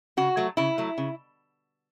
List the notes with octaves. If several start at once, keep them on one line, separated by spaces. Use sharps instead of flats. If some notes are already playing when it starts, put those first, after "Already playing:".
C#3 F#4
F#3 A3
C#3 E4
F#3 A3
C#3